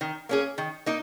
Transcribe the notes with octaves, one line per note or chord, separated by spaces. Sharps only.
D#3
A#3 C#4 G#4
D#3
A#3 D#4